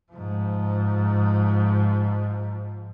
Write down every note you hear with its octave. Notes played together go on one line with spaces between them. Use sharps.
G#2 F3